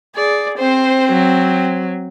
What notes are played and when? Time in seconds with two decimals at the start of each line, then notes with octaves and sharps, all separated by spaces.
0.16 G#4 D5
0.58 C4 C5
1.12 F#3